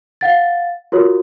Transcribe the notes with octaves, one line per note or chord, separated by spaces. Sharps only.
F5 F#5 A6
F4 F#4 A#4 C#5